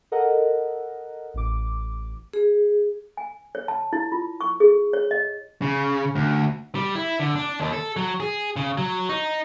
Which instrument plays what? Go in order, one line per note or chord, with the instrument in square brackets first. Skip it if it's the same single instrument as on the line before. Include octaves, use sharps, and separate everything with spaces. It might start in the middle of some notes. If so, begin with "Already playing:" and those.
[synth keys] A4 A#4 D#5 F#5
A1 D6
[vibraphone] G#4
[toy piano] G#5
C#5
A5
E4
F4
C#6
G#4
C#5
D#5
[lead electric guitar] C#3
D2
G3
E4
D3
D4
D#2
A4
F#3
G#4
C#3
F#3
D#4